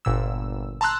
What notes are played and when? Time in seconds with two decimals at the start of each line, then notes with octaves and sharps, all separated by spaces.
0.05 G1 A#2 E6
0.81 A5 A#5 C6 E6 F#6